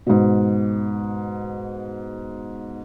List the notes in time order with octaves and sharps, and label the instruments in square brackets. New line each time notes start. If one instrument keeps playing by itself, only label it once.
[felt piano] G#2 B2